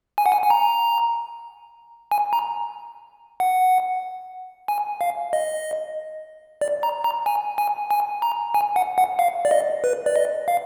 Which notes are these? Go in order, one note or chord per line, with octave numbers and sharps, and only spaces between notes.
G#5
F#5
G#5
G#5
A#5
G#5
A#5
F#5
G#5
F5
D#5
D5
A#5
A#5
G#5
G#5
G#5
A#5
G#5
F#5
F#5
F5
D5
D#5
B4
D5
D#5
F5